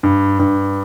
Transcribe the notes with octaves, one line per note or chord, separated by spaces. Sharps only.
G2
G2